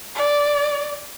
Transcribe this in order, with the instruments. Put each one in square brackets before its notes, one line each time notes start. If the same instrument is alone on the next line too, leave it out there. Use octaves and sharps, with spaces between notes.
[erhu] D5